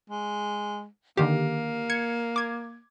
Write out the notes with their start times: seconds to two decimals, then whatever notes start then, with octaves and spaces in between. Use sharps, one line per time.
0.10 G#3
1.17 D3 D#3 A#3 G4
1.90 G#6 C#7
2.36 D6 G#6